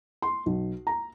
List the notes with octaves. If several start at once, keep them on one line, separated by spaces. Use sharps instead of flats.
C6
B1
A#5